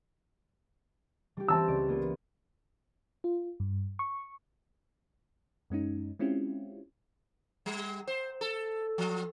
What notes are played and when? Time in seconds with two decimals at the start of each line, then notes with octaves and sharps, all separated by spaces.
1.37 G3 G4
1.48 E3 C4 A5 E6
1.68 C#2 D5 D7
1.88 A#3 B3 F4
3.24 F4
3.60 G2
3.99 C#6
5.70 F#2 G#3 C#4 D#4
6.19 G#3 C4 C#4 E4 F4 G4
7.66 G3
8.07 C5
8.41 A4
8.98 F3